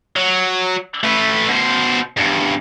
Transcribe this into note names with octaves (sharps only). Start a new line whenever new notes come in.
F#3
A3 B4
B2 C5
E2 G2